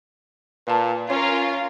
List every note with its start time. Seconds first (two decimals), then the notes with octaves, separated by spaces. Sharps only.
0.67 A#2 B4 F5 A5
1.10 C#4 F4 A#4 C#5